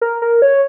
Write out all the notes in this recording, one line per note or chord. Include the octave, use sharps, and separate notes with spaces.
A#4
A#4
C#5